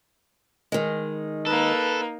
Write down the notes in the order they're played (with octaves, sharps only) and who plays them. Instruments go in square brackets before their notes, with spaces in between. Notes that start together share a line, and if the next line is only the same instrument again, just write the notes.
[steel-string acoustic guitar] D#3 G#3
[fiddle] A#3 D#4 [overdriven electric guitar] A4 [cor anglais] B4